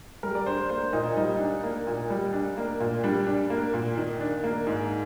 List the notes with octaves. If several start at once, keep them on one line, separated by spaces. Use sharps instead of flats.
G3 A#4
D5
D4 C5
A#3 C5
A#2 D#4
G3 D#4
D4
A#3
A#2
G3
D4
A#3
A#2
G3 D4
D4
A#3
A#2
D#3
D4
A#3
G#2